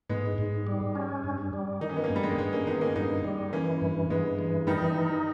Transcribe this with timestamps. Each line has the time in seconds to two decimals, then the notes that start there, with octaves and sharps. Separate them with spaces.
0.10 G#2 G#3 B3
0.38 G#2
0.67 G3
0.95 C#4
1.24 G2
1.53 G3
1.81 D#3 D#4
1.89 C#4
1.96 B3
2.04 A#3 C#4
2.10 G2
2.16 G3
2.23 G#3
2.31 A#3
2.38 G2 G#3 B3
2.53 A#3 C#4
2.67 D#3 B3 D#4
2.81 A#3 C#4
2.96 G2 B3 D#4
3.24 G3
3.53 E3 A#3 C#4
3.82 G2
4.10 G2 G#3 B3
4.39 E3
4.67 D#3 G3 D#4
4.96 D#4